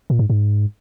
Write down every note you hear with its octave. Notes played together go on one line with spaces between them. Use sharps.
A#2
G#2
G#2